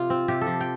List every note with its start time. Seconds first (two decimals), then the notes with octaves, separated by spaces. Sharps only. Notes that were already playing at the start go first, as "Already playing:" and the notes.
Already playing: C3 F4
0.10 C4
0.28 C3 G4
0.42 A4
0.47 F3
0.61 G5